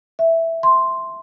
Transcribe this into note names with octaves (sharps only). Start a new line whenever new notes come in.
E5
C6